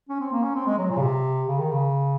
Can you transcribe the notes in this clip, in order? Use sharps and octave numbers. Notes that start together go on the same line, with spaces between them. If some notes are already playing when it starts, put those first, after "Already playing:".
C#4
C4
A#3
C#4
C4
G#3
F#3
A#2
C#3
C3
C#3
D#3
C#3